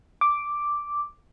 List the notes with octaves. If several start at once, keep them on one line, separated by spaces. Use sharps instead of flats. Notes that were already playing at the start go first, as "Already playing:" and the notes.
D6